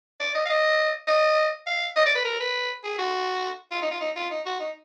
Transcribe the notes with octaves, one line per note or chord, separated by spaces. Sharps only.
D5
D#5
F5
D#5
D#5
F5
D#5
D5
B4
A#4
B4
G#4
F#4
F4
D#4
F4
D#4
F4
D#4
F#4
D#4